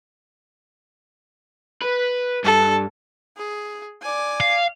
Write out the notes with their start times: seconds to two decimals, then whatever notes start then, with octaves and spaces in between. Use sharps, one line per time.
1.82 B4
2.45 G2 A4
3.37 G#4
4.02 D5 G#5
4.40 F5